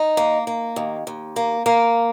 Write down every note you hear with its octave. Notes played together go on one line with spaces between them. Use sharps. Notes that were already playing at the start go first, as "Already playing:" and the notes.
Already playing: D#4
A#3
A#3
D#2
D#2
A#3
A#3